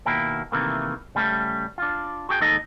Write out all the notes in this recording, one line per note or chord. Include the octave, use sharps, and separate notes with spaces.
D#2 B2 A#3 E4 G5
C3 D#3 E3 A3 A#3
C#3 G3 A3 A#3 C#4
D4 F4
F#4 G#4 G5
D#2 G#3 D#4 A4 D#5